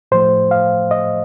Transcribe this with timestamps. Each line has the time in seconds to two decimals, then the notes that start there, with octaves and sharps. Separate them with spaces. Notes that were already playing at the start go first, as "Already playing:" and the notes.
0.12 A2 F3 A3 C5
0.51 F5
0.91 D#5